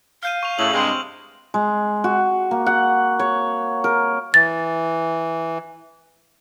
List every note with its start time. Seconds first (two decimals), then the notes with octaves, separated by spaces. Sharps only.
0.23 F5 F6 G6 D#7
0.43 C#6 F7
0.59 A2 C#3 E5 F#7
0.74 G2 C3 G#3 C4 F#7
1.54 G#3
2.04 F#4
2.51 A#3
2.66 F#5
3.19 C#5
3.84 A#4
4.34 E3 A6